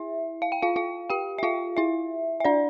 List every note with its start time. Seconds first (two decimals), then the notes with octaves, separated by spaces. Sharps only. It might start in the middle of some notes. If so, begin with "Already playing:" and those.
Already playing: E4 E5
0.42 F5
0.52 G5
0.62 F4 F5
0.76 F4 F5
1.10 G4 G5
1.38 E5
1.43 F4 F5
1.77 E4 E5
2.40 E5
2.45 D4 D5